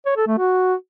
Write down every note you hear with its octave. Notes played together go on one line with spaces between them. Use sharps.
C#5
A4
A3
F#4